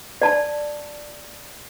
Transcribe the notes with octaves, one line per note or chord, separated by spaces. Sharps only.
D5 A5